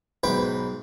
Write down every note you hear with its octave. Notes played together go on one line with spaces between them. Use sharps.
B1 G#2 B4 G5